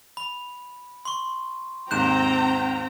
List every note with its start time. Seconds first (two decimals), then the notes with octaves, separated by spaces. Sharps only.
0.17 B5
1.05 C6 C#6
1.91 D#2 G#2 C4 G5 A#5 F#6 G6 E7